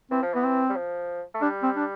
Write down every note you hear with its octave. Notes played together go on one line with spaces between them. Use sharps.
E3 C4
F3
E3 B3
C4
G3
F3
A3
G3 D4
C4
D4